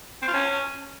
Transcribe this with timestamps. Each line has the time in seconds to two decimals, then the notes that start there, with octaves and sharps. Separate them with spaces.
0.22 C4
0.28 F4
0.34 C#4